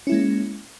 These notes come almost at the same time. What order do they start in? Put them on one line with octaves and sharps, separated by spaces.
C#4 E4 G#3 A#3